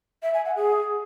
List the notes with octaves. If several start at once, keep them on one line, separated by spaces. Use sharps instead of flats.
E5
G#5
F#5
G#4